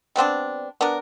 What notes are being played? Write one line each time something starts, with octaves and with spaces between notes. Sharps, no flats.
G3 B3 C4 D4
B3 D4 A#4